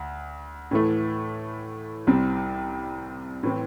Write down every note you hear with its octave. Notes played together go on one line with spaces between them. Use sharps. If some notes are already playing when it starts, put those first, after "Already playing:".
Already playing: D2
A2 E3 A3
C2 C3 G3 C4
A2 E3 C4